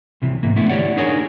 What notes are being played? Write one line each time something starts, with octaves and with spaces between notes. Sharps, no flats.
C2 C3 E3
G#2 E3 A#3
D3 A3 B3 E4
E4 G4 C#5 D5 F#5
D4 D#4 G#4 A#4 C#5 G#5